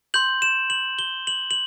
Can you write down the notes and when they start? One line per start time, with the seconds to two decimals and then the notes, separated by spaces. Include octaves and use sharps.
0.14 C6 G6 F#7
0.42 E7
0.70 F#7
0.99 G7
1.27 F#7
1.51 F#7